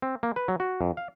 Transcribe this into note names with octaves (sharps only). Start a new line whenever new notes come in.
C4
A#3
B4
F#3
F#4
F2
F5